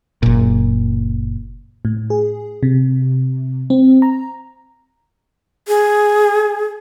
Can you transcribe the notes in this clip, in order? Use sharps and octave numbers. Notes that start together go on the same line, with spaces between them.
F#1 A#2
A2
G#4
C3
C4
A#5
G#4